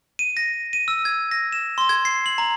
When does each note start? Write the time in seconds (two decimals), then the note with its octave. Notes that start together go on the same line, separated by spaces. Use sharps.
0.19 D#7
0.37 A#6
0.73 D#7
0.88 E6
1.05 G#6
1.31 A#6
1.52 E7
1.78 C6
1.89 G#6
2.05 C7
2.26 F#7
2.38 A#5